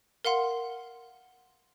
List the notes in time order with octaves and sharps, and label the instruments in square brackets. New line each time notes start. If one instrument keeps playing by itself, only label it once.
[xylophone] A#4 F5 F#5 C6